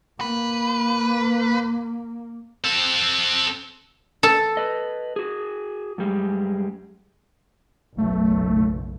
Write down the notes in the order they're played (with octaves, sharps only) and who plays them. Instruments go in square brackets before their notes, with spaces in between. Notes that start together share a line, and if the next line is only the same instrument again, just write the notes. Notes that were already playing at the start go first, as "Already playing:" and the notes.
[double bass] A#3 [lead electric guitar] B4
[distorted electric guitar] C4 A4
[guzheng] A4
[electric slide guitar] B4 D#5
F#4 G#4
F#2 G3 G#3
[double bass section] F#1 B1 [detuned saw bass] A3